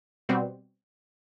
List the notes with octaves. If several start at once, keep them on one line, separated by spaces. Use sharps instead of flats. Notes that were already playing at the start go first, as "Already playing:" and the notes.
B2 G3 C4 F#4